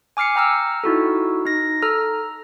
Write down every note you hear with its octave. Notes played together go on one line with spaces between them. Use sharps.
G#5 D6 F6 C7 C#7
G5 A#5 E6 F6
D#4 E4 F#4 A4
D#4 A#6
A4 A#5 F6